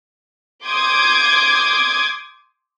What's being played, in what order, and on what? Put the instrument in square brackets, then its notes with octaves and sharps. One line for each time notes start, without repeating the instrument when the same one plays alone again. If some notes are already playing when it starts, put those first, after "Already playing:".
[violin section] C6 D6 D#6 G6 G#6